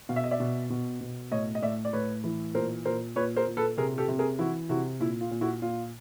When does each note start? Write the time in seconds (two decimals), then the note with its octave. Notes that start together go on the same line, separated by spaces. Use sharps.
0.09 B2 F5
0.16 E5
0.24 D#5
0.31 D5 E5
0.40 B2
0.70 B2
1.01 B2
1.31 A2 C#5 D#5
1.55 D#5
1.62 A2 D5 E5
1.85 D5
1.93 A2 B4 C#5
2.24 E3
2.54 A#2 A#4 C5
2.85 A#2 A#4 C5
3.16 A#2 B4 C#5
3.36 A#4 C5
3.47 A#2
3.57 A4 B4
3.77 C3 G#4 A#4
3.98 G4 A4
4.08 C3
4.19 G#4 A#4
4.39 E3 E4 F#4
4.69 C3 E4 F#4
5.00 A#2 E4
5.21 F4
5.31 A#2
5.41 E4 F#4
5.62 A#2 F4